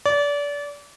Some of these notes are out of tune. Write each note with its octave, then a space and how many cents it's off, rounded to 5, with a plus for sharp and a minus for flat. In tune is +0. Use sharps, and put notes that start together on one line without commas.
D5 -30